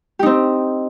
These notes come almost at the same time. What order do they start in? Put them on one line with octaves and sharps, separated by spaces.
G4 D#4 C4